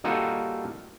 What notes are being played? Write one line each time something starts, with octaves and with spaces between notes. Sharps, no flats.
G3 A#3 D#4 F4 F#4 A4